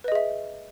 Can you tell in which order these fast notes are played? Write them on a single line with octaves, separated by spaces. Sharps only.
B4 D#5 G#4 E5